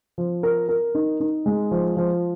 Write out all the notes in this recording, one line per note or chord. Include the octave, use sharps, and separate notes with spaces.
F3
A#4
A#4
D#4
D#4
G#3
F3
F3